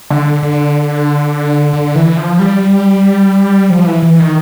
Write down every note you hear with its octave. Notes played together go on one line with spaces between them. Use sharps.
D3
D3
D3
E3
F3
G3
F3
E3
E3
D#3